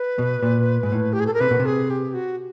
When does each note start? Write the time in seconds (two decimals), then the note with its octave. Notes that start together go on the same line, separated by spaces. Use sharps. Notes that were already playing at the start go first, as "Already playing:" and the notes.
Already playing: B4
0.18 B2
0.43 A#2
0.83 G#2
0.92 A2
1.13 G4
1.20 G#4
1.27 A4
1.34 A#4
1.40 C3 B4
1.51 B2
1.60 C3
1.66 G#4
1.90 G4
2.14 F#4